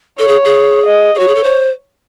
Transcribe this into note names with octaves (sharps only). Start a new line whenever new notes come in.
A4 C#5
G#4
G#4
D#5
G#4
F#4 C#5
G#4
A4
C5